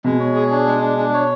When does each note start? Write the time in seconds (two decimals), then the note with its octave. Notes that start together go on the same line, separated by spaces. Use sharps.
0.04 B2 G#3
0.20 C#5
0.35 G#4
0.51 D4
0.66 G#3
0.82 D4
0.98 D4
1.13 C#5